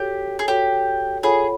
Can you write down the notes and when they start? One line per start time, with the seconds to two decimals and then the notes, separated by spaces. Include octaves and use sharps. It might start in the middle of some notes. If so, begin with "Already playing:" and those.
Already playing: F#4 G4 A4 C#5
0.39 G#4
0.48 F#4 G4 A4 C#5
1.23 F4 G#4 A4 C#5 F#5 B5